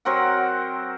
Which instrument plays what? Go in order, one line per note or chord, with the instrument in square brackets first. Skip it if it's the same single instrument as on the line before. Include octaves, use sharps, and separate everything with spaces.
[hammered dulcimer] F#3 C4 A#4 F#5